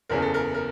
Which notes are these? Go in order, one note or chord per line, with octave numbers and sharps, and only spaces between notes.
F#1 E2 C#3 A#4
A4
A#4
A#4